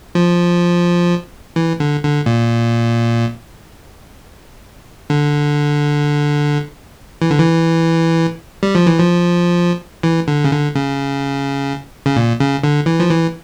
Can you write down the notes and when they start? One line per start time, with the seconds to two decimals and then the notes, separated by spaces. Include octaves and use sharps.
0.15 F3
1.56 E3
1.80 D3
2.04 D3
2.26 A#2
5.10 D3
7.22 E3
7.31 D3
7.39 E3
8.63 G3
8.75 F3
8.86 E3
8.99 F3
10.03 E3
10.28 D3
10.44 C#3
10.51 D3
10.75 C#3
12.06 C#3
12.16 A#2
12.40 C#3
12.64 D3
12.86 E3
13.00 F3
13.10 E3